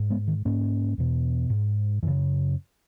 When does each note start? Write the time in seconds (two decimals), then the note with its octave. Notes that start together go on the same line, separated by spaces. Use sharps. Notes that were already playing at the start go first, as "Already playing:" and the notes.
Already playing: G#2
0.10 G#3 B3
0.28 D#3
0.45 G#2 A#3 C#4
0.98 E2 B2
1.50 G#2
2.03 F#2 C#3 E3